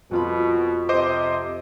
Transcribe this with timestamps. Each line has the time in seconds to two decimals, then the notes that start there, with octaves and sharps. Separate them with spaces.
0.11 F2 B2 F4 B5
0.89 C3 C5 D#5 D6